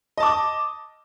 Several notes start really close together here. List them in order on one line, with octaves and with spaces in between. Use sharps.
D#5 A5 D6